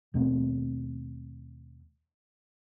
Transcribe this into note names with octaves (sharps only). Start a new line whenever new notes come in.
D#2 B2 A3 C4